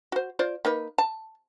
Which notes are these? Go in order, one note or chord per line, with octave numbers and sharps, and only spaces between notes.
F#4 C5
F4 C5 D5
A#3 D#4 B4
A5